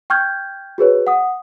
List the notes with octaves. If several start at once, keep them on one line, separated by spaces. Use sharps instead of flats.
G5 C#6 F6 G6 G#6
F#4 G#4 B4 C#5
F#5 D#6